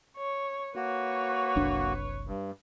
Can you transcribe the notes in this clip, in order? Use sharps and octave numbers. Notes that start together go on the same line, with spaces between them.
C#5
A#3 F#4 B4 C#5
F#1 C2 D4
G2